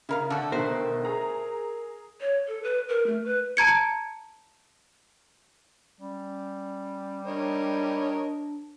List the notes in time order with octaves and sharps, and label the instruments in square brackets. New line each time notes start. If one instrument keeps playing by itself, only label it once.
[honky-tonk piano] C#3 [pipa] E4 A#4 F5
[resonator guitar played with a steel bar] D3 [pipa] A3 F#4 [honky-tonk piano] A4 F#5
[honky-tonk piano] B2 D3 D#3 [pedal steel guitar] A#4 E5 F#6 [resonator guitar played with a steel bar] C5
[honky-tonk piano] G#4 A#5
[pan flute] C#5
A4
B4
A#4
A3
B4
[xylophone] A5 A#5 G#6 C#7
[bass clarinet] G3 [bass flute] C#4
[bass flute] D4 [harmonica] A#4 C#5 D#5